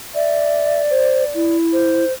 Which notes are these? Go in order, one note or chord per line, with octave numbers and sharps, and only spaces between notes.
D5 E5
C5
E4
C5